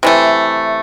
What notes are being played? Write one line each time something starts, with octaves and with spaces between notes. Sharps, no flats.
C3 E3 A3